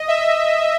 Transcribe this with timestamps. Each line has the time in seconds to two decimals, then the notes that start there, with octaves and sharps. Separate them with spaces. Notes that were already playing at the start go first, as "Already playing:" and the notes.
Already playing: D#5
0.08 E5